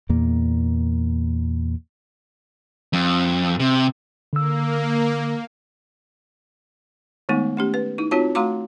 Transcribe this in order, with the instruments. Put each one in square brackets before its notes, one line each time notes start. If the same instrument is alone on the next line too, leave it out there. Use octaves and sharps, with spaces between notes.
[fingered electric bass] E2 A#2 A#3
[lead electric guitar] F2
C3
[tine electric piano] D3 E6 [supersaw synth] A#3
[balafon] D#3 G#3 A3 B3 D#4
A3 C#4 G4
B4
D#4 E4
C4 D#4 F4 F#4 C#5 A5
A3 F#4 F5 A#5 C6 D6